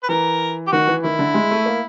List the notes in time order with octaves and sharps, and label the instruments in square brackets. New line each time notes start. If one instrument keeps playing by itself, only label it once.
[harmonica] B4
[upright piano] E3 [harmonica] A#4
[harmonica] G4
[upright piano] D#3 [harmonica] F#4
[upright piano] E3
[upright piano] D#3 [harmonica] E4
[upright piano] D3
G#3
A3
A#3